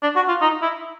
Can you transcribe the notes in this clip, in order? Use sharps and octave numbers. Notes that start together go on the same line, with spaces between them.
D4
F#4
F4
D#4
E4